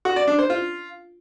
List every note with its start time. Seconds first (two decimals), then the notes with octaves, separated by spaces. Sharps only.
0.05 F#4
0.16 D5
0.27 D4
0.39 C5
0.50 F4